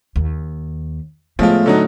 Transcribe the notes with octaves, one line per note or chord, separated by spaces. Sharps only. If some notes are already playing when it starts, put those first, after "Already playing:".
D#2
A2 F3 G#3 A3 B3 F4
D3 F#3 D#4 F6